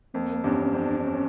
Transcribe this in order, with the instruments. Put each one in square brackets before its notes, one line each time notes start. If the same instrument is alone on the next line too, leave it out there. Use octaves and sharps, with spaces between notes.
[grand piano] F2 [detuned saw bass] A#3
[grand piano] E2 G2 [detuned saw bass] C#4
[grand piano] F2 [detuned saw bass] D4
[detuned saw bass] D4
C#4